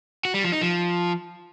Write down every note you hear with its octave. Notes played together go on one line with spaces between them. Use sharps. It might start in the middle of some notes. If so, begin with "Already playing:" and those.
F#4
G3
F3
D#4
F3